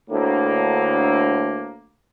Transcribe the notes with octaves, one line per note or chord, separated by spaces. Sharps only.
D2 A2 D3 A3 A#3